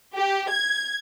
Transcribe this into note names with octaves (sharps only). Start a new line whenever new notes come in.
G4
G#6